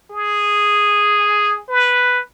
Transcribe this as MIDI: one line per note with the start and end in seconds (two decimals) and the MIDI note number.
0.11 1.61 68
1.68 2.20 71